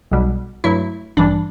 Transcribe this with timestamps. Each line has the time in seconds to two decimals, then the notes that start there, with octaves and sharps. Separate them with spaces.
0.11 B1 B2 G3
0.64 G2 F#3 A3 E4
1.17 A1 G2 E3 G3 D4